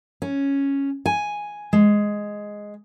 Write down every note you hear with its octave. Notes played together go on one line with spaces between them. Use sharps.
C#4
G#5
G#3